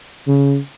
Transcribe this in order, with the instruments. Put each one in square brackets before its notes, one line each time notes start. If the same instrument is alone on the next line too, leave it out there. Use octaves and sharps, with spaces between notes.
[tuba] C#3